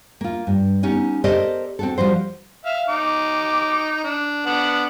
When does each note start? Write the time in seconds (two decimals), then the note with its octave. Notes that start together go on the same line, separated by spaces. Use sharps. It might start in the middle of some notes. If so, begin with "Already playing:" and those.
0.21 A#3 F4
0.47 G2
0.83 B3 C#4 D#4 G4
1.24 G4 A4 A#4 C5 D5 D#5
1.79 C4 F#4 A4
1.98 F3 G3 F#4 C5
2.66 E5 F5
2.89 D#4 D6
4.04 D4
4.46 B3 D4 F#5